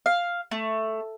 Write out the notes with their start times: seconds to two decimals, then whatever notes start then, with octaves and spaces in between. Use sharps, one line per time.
0.06 F5
0.51 A3